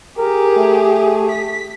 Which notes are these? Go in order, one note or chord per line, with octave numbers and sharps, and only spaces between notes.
G4 G#4 A#4
A3
B6